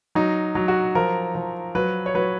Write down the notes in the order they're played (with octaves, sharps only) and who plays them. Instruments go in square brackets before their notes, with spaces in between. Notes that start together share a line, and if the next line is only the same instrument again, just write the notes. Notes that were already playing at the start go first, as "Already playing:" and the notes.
[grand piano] F#3 D#4
F#3
F#4
F3 A#4
F3
F#3 B4
C#5
F#3 B4